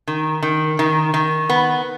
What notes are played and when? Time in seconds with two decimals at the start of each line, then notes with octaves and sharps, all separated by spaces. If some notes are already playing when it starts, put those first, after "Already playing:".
0.07 D#3
0.42 D#3
0.79 D#3
1.14 D#3
1.49 B3